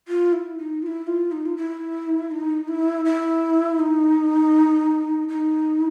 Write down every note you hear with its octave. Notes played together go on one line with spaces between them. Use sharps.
F4
E4
D#4
F4
E4
F4
D#4
F4
E4
D#4
E4
E4
D#4
D#4